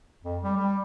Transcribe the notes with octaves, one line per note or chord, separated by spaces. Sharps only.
F2
G3
G3